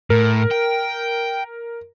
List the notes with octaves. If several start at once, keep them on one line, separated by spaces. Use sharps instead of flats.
A2 A#4
G5